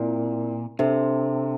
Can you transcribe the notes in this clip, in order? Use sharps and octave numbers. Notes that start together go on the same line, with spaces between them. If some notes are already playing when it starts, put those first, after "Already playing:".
Already playing: A#2 C4 E4 A#4 D5
C3 D4 A4 C5 E5